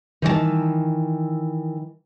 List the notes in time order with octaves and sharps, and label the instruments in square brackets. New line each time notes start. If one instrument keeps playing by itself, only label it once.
[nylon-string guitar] D#3 E3 C#5 A5